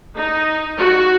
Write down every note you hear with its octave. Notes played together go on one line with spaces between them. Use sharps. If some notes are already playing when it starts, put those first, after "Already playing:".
D#4
F#4